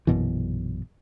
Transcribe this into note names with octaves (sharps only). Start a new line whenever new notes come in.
A#1 F#2 B2 E3